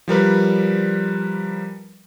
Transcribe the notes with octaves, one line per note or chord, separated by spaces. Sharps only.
F3 G3 A#4 B4